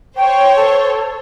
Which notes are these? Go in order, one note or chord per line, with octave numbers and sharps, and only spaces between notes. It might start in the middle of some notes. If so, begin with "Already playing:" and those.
C5 C#5 G5
A4